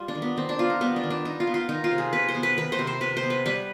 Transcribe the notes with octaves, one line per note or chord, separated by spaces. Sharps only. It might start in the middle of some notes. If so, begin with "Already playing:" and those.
Already playing: G3 F4
D4
D#3
B3
D#3 C4
D4
B3 F4
D#4
G3 B3
D4
D#3
D4
D#3 D#4
F4
B3
F4
D#3 D#4
F4
C3
G#4
C3 B4
C5
B3
B4
D#3 B4
C5
C3
C5
C3 B4
C5
B3
B4
G3 B4